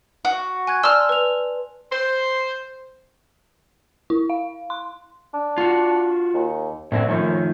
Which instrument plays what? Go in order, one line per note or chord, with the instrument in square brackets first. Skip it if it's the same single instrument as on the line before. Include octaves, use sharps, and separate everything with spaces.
[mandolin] F#4
[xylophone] G#5 F#6 G#6
[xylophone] D5 A5 C6 [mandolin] E6 F6
[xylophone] B4 F7
[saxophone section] C5
[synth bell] E4
F5
C6
[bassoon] D4
[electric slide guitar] F4 F#4
[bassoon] D#2
[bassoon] C2 [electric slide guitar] A2 D3 C4
[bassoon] F#2 [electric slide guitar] D#3 F3 A3